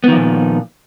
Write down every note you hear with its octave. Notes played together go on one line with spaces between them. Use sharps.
A#2 D#3 F3 B3